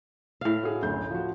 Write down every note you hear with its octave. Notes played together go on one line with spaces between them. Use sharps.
A2 F5
F#4 G#4
F#1 D2 G6
F3 F#4